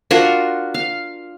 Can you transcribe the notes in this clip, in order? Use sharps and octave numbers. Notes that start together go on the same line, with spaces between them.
D4 F4 F#4 A#4
F5